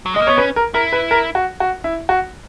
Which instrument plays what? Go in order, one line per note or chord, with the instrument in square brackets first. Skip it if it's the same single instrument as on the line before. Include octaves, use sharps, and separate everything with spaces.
[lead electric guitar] F#3
[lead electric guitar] G#3 [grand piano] D#5
[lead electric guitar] A#3
[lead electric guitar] B3 [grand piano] C#5
[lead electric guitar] C#4 [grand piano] B4
[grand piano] A#4
[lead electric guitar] E4 [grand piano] A#4
[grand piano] B4
A#4
F#4
F#4
E4
F#4